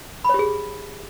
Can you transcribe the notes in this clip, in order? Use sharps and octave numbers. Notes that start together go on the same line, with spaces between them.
G4 G#4 C#5 B5